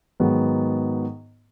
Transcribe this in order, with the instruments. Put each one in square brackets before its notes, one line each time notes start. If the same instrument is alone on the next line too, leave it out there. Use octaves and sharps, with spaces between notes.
[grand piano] G#2 D#3 F#3 B3